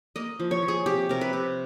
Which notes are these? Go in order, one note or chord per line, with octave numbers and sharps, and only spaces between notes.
A#3 D#5
F3
C#5
F3
G#4
C3 G4
C3 A#4
B4
C3